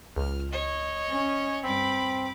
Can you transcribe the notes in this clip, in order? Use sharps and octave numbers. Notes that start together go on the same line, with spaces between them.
C#2 F6
C#5 D#5
C#4
G2 C4 B5 D6